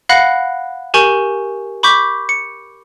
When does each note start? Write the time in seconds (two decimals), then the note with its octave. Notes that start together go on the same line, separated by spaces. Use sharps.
0.09 F5 F#5 B5 F#6 A#6 C#7
0.94 G4 A#4 G#5 C#6 G6 F#7
1.83 B5 C#6 D6 G6 B6
2.29 C#7